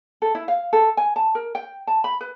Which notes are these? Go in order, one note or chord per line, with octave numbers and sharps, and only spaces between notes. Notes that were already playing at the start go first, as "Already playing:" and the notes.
A4
E4
F5
A4
G#5
A5
A#4
G5
A5
B5
B4